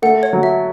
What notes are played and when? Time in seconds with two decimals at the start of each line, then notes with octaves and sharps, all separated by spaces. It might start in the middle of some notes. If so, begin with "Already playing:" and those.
0.02 A3 F#5
0.23 C#5
0.33 F#3
0.43 E5